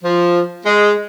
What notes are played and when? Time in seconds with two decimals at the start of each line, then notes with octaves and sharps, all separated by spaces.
0.04 F3
0.66 G#3